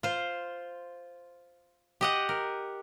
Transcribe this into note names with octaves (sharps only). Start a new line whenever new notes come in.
F4 C5
G4 D#5 F#5
A#4